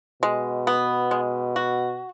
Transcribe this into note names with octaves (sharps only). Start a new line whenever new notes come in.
B2 G#3
B3
G#3
F#4